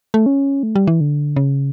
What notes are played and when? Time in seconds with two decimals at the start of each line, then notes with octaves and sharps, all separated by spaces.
0.14 A3
0.26 C#4
0.63 A3
0.76 G3
0.87 E3
1.01 D3
1.36 C#3